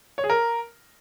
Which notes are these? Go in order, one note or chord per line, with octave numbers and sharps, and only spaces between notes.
C#5
G#4
A#4